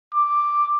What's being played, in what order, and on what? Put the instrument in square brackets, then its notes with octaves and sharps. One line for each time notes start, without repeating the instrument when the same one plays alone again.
[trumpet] D6